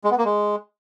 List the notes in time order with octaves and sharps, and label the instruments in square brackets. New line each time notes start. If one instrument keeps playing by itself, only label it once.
[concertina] G#3
B3
A#3
G#3